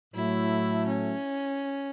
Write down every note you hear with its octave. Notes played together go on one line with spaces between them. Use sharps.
A2 F#3 A3 E4
C#4